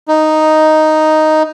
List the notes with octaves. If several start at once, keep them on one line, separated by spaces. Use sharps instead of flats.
D#4